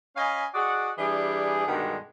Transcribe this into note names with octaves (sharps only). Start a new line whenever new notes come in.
C#4 D#5 F5 G#5 B5
F#4 G#4 D5 D#5 F#5
E3 G3 D4 G#4
G2 B2 D3 D#3 G3 G#3